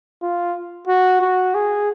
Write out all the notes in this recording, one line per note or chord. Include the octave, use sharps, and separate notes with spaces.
F4
F#4
F#4
G#4